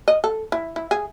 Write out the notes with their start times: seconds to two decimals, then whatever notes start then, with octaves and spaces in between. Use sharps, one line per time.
0.08 D#5
0.24 A4
0.52 E4
0.76 E4
0.91 G#4